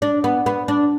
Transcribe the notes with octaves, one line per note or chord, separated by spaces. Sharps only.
D4
B3
B3
D4